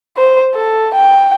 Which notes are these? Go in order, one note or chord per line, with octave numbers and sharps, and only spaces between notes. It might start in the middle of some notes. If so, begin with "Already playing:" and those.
C5
A4
G5